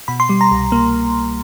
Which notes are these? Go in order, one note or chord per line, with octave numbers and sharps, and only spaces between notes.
B2 B5
C6
G3
A#5
C2
A#3